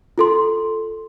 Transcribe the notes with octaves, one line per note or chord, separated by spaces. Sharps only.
F4 A4 C6